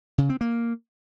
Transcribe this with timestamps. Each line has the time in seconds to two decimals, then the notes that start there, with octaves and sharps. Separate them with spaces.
0.18 C#3
0.29 C4
0.41 A#3